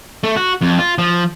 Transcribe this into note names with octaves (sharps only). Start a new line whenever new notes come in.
A3
F#4
F2
F4
F3